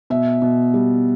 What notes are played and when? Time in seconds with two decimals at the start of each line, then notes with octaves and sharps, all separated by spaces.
0.10 B2 E5
0.42 B2
0.74 G3